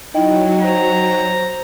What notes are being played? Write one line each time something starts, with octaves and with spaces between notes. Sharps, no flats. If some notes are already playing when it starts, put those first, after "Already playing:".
F#3 D#4 E4 D#5 G5
C5 A#5